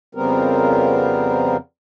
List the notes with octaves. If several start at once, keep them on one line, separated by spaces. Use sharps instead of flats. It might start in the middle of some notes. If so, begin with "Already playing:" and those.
F2 C#3 G3 B3 C4 A#4